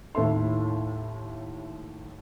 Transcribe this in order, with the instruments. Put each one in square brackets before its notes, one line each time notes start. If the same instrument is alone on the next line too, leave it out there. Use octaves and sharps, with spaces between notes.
[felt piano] D#2 A2 E4 A4 E5 C6